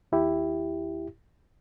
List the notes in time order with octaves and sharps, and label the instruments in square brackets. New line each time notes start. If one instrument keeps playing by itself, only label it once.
[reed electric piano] D#2 E4 G4